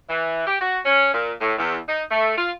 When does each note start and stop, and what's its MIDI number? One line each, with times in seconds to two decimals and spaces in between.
0.10 0.44 52
0.47 0.61 67
0.61 0.80 66
0.85 1.12 61
1.14 1.32 46
1.41 1.54 45
1.58 1.77 40
1.89 2.03 63
2.11 2.35 57
2.38 2.52 65